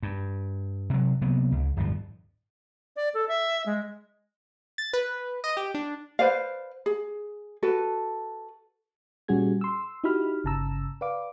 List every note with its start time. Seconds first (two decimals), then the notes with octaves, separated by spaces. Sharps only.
0.03 G2
0.90 C3 F#3
1.21 C3 F#3 A#3 B3
1.52 C#2
1.76 D1 G1 G2 F3
2.96 D5
3.14 A4
3.29 E5
3.66 G#3
4.78 A6
4.93 B4
5.44 D#5
5.57 G4
5.74 D4
6.19 B4 C5 D5 F5
6.86 G#4
7.63 F#4 A4 B4
9.28 A#2 G3 C#4 F#4 G#4 G#6
9.61 C6 E6
10.04 D#4 E4 F#4 G4 B5 F6
10.44 G1 C#3 A5 A#5 E6
11.01 B4 D5 F5 D6